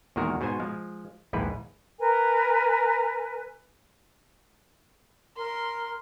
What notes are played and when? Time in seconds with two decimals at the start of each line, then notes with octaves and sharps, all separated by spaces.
0.16 E2 A#2 D#3 G#3 F#4 A#4
0.41 G#2 B2 F#4 C5 G#5
0.60 F3 G#3
1.33 A#1 D#2 G#2 E4 B4
1.99 A#4 B4 G#5
5.37 A#4 C6